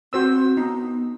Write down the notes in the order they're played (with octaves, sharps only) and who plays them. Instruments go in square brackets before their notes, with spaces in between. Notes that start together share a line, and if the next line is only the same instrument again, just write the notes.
[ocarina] C4 [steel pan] F#4 C5 E6
[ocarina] B3 [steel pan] D#4